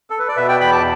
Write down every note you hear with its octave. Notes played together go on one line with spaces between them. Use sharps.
A4
B4
D5
B2 B4 E5
D5 G5
E2 G5 B5
A5 D6